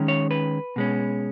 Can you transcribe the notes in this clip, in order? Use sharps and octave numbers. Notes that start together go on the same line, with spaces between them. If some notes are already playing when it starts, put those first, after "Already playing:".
Already playing: D#3 G#3 C#4
C#5
B4
B2 G#3 C#4